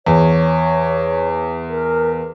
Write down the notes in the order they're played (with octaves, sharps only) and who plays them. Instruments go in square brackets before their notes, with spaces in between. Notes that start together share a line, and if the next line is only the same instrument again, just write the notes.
[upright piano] E2 [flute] C#5
[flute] A#4